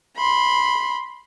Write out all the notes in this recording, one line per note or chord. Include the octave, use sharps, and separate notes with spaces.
B5 C6